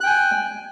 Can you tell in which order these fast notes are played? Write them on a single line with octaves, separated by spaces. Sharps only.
F#6 G5 G#5